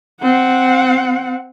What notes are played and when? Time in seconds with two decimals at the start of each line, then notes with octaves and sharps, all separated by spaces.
0.22 C4 F#5